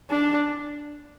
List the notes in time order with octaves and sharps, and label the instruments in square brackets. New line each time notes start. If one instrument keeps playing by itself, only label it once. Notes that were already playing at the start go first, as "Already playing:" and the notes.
[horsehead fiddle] D4